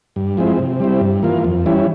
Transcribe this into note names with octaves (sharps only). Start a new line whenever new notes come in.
G2
F3 G#3 C4 E4
C3
G3 C4 E4
G2
E3 A#3 F4
F2
E3 G3 C#4 E4